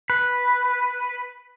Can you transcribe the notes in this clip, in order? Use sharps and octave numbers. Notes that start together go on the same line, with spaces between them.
B4